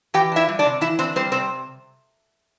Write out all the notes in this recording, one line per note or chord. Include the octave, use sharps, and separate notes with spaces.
E3 G4 G5
D4 E4 E5
G3
D4 D5
C3
E3 E4 E5
C4 D4 C5
G3 C4 C5
C3 C4 C5